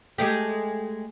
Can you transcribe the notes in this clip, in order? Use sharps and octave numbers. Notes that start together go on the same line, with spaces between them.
G#3 A3 G4